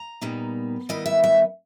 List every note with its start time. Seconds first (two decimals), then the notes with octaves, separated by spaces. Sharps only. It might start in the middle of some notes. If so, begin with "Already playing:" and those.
Already playing: A#5
0.21 A#2 G3 B3 D#4
0.89 D#3 G3 B3 E4 D#5
1.06 E5
1.24 E5